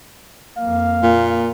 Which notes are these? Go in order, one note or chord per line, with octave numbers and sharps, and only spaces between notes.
F2 A#3 F5
A#2